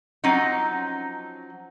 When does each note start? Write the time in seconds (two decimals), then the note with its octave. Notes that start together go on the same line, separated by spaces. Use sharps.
0.24 F3 F#3 C4 C#4 D#4